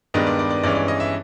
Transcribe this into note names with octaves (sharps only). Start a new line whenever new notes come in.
G2 D#3 G#3 B3 D4 D#5
D5
D5
D5
G2 E3 G#3 C#4 D5
D5
D#5
E5